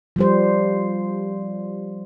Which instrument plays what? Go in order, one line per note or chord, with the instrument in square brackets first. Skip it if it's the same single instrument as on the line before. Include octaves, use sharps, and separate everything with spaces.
[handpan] F3 G3 C5